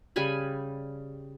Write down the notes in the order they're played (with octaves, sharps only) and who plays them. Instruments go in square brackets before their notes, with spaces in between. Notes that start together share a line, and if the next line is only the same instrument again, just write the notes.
[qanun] C#3 G3 G#5 B5